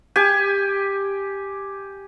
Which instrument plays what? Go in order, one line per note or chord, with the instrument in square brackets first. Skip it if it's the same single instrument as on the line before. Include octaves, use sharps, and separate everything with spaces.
[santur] G4 G#5